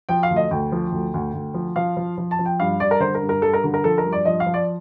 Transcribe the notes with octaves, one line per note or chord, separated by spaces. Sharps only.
F3 G5
F5
D2
D#5
D2 G5
F3
D2
D2
D2
F3
F3 F5
F3
F3
A5
F3
G5
G2 F5
G2 D5
A#4
D3 C5
A#4
G2
A#4
G2 A4
A#4
D3
A#4
F3 A4
A#4
G2
D5
F3 D#5
F5
F3
D5